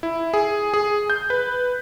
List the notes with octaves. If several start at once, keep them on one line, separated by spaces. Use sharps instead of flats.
E4
G#4
G#4
G6
B4